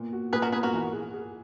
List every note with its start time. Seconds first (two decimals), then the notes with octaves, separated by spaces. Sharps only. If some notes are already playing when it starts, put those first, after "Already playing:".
Already playing: A#2 B3
0.13 F#4
0.33 A#2 G#4 B4
0.42 F#4 A#4
0.52 B3 G#4 B4
0.63 F#4 A#4
0.74 E3
0.93 G#4
1.14 G#4